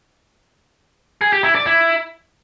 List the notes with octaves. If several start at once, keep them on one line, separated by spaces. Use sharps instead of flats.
G#4
G4
E4
D5
E4